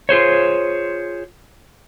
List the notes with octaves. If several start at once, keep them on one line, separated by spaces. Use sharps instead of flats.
F4 G#4 C5 C#5